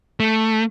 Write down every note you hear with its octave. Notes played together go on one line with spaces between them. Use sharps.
A3